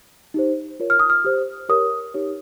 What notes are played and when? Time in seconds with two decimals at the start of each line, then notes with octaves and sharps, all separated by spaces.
0.34 D#4 G4 C5
0.80 F4 A#4 C#5
0.90 F6
1.00 D#6
1.10 F6
1.25 G4 C5
1.69 G4 A#4 C#5 D#6
2.14 D#4 G4 C#5